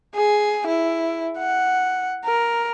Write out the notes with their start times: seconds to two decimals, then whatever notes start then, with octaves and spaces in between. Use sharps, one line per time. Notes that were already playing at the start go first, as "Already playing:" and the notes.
0.15 G#4
0.67 E4
1.39 F#5
2.25 A#4